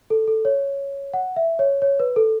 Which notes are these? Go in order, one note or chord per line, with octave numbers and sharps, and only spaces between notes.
A4
A4
C#5
F#5
E5
C#5
C#5
B4
A4